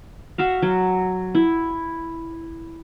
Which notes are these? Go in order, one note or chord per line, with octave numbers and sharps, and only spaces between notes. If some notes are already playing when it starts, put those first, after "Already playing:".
F#4 E5 F5
F#3
E4